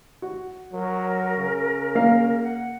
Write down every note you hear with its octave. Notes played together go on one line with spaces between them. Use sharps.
F#4
F#3 A#4
C#3
A#3 F5
F#5